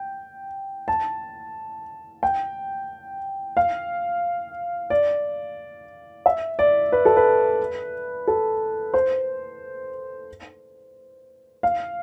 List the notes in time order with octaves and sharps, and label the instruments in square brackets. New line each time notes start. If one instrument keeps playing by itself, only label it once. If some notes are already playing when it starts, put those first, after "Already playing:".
Already playing: [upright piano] G5
A5
G5
F5
D5
E5
D5
B4
A4
B4
A4
C5
F5